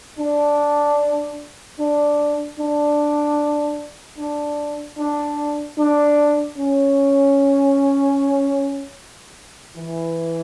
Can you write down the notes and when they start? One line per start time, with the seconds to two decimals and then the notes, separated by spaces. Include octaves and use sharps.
0.19 D4
1.79 D4
2.59 D4
4.18 D4
4.98 D4
5.79 D4
6.58 C#4
9.77 E3